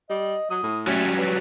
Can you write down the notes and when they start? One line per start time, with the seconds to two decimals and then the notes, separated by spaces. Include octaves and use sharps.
0.10 G3 D#5
0.50 F#3 D#6
0.63 A2
0.87 F#3 G3 A3 C#4
1.16 B4